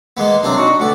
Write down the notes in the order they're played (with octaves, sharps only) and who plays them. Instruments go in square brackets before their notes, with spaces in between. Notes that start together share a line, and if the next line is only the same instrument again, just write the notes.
[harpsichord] G#3 A#3 B3
[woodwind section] F#2 C3 F#3 [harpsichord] C4 D4
[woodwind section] D#4 F#4 C#6
[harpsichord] D2 D5 [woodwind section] F#4 A4 B4